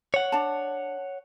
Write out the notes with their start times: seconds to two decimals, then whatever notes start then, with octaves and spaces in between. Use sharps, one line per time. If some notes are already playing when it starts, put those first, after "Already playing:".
0.14 C#5 F#5
0.32 D4 A5